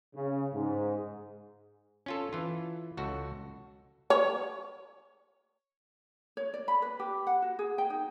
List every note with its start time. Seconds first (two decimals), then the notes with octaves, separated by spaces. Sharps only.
0.14 C#3
0.53 G#2
2.06 C#4 F4 A4
2.33 E3 F4
2.97 C#2 F#4 A4
4.10 C#5
6.37 C#5
6.54 D5
6.68 B5
6.82 B4
7.00 G4
7.27 F#5
7.42 F#4
7.59 G#4
7.78 G5
7.90 D#4